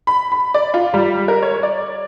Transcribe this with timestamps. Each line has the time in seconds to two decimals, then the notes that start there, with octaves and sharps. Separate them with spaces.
0.07 B5
0.32 B5
0.54 D5
0.74 F4
0.94 G3
1.28 A#4
1.43 C#5
1.63 D5